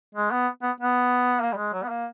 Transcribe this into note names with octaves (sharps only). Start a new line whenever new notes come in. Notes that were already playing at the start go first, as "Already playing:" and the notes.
G#3
B3
B3
B3
A#3
G3
G#3
F#3
B3
A#3